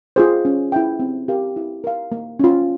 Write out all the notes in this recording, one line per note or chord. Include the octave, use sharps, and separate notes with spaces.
F4 G#4 C5
C#4
E4 G#4 E5 G5
C4
G4 A#4 F5
E4
A#4 F5
A#3
C#4 F4